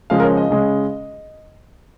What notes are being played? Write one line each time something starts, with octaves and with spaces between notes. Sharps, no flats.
C#3 F3 G#3 F5
A#4
C#5
D#5
C#3 G#3